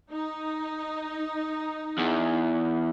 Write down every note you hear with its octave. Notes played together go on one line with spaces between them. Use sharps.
D#4
E2